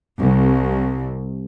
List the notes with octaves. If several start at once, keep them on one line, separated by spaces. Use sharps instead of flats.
C2